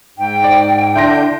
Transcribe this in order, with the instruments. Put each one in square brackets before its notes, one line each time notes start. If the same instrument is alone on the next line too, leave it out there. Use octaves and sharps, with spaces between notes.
[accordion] G#2 [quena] G5
[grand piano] D5
[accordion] D3 D4 G6 [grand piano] E4 C6 A#6